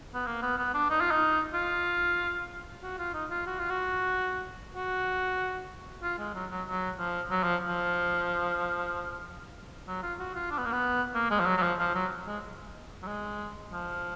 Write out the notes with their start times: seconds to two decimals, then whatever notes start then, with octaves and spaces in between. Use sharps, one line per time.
0.14 B3
0.27 A#3
0.42 B3
0.58 B3
0.74 D4
0.90 D#4
1.01 F4
1.11 D#4
1.54 F4
2.83 F#4
2.98 F4
3.14 D#4
3.30 F4
3.46 F#4
3.59 F4
3.70 F#4
4.75 F#4
6.03 F4
6.19 G#3
6.34 F#3
6.51 F#3
6.67 F#3
6.99 F3
7.31 F#3
7.43 F3
7.68 F3
9.87 F#3
10.03 F4
10.19 F#4
10.35 F4
10.51 D4
10.58 B3
10.66 A#3
10.72 B3
11.15 A#3
11.30 G#3
11.40 F3
11.46 F#3
11.57 F#3
11.62 F3
11.79 F3
11.94 F#3
12.27 G#3
13.03 F#3
13.07 G#3
13.72 F3